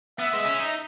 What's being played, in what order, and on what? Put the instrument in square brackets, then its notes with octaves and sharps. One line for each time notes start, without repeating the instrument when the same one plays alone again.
[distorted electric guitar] B3 [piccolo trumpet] E5
[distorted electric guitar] G#3
C#4
D#4